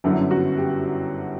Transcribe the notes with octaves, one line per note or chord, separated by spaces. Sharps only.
G1 F#2 D3 F#3 E4
F#4
G4